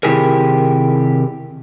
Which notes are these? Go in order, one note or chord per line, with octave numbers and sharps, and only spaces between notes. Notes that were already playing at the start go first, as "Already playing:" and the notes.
C3 D#3 E4 G4 G#4 A#4